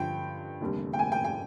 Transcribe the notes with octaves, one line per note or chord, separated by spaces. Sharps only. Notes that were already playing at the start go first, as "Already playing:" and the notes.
Already playing: G2 D3 F3 G5
F1 D#2 D3 G3
G5
G#5
G5
G5